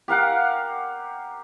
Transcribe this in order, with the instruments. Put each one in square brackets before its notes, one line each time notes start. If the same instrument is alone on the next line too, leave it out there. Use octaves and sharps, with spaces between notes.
[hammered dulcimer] G4 A#4 F5 F#5